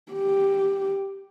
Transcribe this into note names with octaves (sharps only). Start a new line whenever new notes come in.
G4